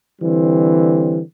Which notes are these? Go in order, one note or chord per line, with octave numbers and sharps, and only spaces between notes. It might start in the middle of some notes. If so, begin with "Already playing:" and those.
D3 E3 G3 C4